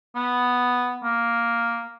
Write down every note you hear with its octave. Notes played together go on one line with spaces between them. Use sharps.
B3
A#3